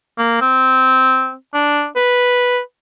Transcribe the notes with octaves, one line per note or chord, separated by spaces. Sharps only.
A#3
C4
D4
B4